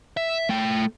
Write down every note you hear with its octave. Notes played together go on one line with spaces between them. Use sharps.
E5
A3 G5